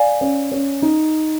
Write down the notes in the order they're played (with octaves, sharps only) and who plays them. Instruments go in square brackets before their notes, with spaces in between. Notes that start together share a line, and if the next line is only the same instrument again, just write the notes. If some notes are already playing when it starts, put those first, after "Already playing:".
Already playing: [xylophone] D5 F5 G#5
[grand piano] C#4
C#4
D#4